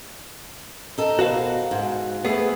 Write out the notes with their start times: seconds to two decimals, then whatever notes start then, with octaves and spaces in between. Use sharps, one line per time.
0.98 D#4 A4 A#4
1.19 B2 F#4 A#4 C5 F5
1.71 G#2
2.25 A3 B3 G#4 B4 G#5